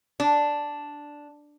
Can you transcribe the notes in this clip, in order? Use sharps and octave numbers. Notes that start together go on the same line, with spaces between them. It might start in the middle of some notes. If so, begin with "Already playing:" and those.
D4